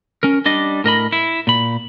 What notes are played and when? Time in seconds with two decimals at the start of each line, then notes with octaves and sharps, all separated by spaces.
0.23 C#4 A#4
0.46 G3 D4 D#5
0.84 A2 A#4 D#5 B5
1.12 E4
1.47 A#2 B5